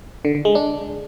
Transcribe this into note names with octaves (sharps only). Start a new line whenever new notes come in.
D3
D3
G#3
D4